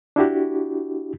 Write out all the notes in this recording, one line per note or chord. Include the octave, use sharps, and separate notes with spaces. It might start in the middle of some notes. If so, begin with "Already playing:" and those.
D4 E4 F#4 G4